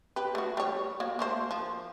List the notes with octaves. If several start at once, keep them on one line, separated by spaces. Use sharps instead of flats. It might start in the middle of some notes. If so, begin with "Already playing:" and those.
G4 B4
A3 F#4
G3 C#5
A#3 F#4
A3 A#3 C5
F3